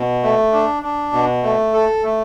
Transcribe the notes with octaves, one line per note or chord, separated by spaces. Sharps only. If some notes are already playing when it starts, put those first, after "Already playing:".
Already playing: B2
A3
D4
D4
B2
A3
A4
A3